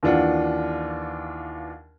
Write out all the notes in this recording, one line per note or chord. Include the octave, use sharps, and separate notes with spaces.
D#2 E3 D4 F4 F#5